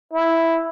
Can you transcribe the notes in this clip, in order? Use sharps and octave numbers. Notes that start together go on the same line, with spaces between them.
E4